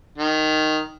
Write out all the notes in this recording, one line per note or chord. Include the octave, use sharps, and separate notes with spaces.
D#3